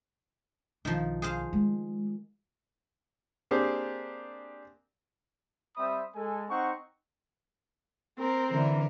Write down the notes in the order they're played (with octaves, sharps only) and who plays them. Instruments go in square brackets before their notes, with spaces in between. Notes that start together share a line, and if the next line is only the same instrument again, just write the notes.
[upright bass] B1 [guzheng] D#3 F3
[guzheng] G#4 C5 F5
[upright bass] G#3
[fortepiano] A#3 C4 D4 G4 G#4
[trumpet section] G3 C4 C5 E5 B5 D#6
G#3 A4 G#5
C4 D#4 F#5 C#6
[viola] C4 A#4
[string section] D3 E3 [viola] A#4